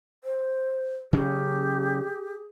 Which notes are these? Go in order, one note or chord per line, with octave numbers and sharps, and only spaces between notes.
C5
C#3 F#3 C#4 G4 G#4